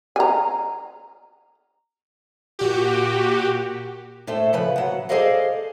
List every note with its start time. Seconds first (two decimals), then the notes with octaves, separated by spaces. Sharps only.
0.16 G#5 A#5
2.59 A#2 F#4 G4
4.27 A2 A3 A4 C5
4.53 C#3 F3 B4
4.76 F#3 F#5
5.09 G#4 A4 C5 D5 D#5 F5